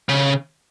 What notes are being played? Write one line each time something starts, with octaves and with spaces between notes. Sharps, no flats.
C#3